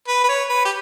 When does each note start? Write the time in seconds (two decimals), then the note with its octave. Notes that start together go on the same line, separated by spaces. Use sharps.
0.08 B4
0.24 B4
0.29 C#5
0.49 B4
0.65 G4